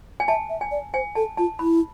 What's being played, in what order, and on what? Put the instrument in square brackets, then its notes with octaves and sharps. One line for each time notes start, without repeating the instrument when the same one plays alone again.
[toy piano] G#5
[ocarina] E5 [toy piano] A5
[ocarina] E5
[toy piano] G#5
[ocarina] D5
[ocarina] C5 [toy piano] G#5
[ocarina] A4 [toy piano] A5
[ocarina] F4 [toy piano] A5
[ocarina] E4 [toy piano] B5